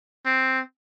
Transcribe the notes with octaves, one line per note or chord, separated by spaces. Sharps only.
C4